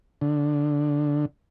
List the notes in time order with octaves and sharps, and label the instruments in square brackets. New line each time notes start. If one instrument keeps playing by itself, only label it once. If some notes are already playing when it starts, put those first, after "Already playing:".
[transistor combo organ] D3